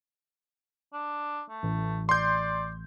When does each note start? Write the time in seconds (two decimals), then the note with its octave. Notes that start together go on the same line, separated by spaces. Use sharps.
0.93 D4
1.49 A3
1.63 A1
2.09 D5 C6 G6